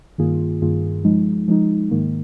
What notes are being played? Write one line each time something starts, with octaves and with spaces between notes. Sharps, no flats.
G2 D#3 A#3 F4 G#4
G2 D#3 A#3 F4 G#4
F3 G#3 D#4
F3 G#3 D#4
G#2 D#3 A#3